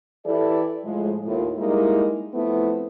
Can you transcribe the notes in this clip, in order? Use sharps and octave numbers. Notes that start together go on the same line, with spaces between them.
E3 E4 G4 A4 D5
A2 F3 G#3
D#2 A2 F4
G3 G#3 A#3 D#4 E4
F3 A3 B3 C4 E4